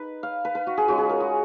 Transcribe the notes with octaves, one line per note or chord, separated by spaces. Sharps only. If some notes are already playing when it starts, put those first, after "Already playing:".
Already playing: D#4 B4
F5
B4
B4
F#4
G#4
G#3 C#4 F4 F#4
G#4
A#4
F#4